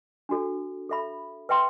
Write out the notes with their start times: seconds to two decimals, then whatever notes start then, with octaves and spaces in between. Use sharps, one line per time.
0.29 D4 F#4 A4
0.89 A4 E5 B5
1.49 B4 E5 G5 C6